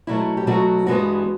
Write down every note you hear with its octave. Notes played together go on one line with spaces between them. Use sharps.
B2 F#3 A3 E4
G4
B2 F#3 A3 F#4
G2 E3 G#3 B3 F#4